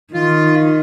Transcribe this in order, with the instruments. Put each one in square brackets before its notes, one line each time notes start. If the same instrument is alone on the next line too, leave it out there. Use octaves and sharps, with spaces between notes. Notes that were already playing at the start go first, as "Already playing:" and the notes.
[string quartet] D#3 [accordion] F4